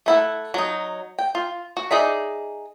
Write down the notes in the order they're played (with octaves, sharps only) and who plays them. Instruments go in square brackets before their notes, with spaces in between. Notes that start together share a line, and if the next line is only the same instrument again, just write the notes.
[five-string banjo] A3 E4 F#5
F#3 D#4
G5
F4
F#4
D#4 G#4 D5 E5